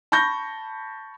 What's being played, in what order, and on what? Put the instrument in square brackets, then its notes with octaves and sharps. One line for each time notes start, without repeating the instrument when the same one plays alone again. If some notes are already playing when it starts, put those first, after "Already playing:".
[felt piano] A5 B5 C#6 G6 A#6